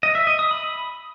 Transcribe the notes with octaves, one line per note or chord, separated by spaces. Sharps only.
D#5
E5
D#5
D#6
B5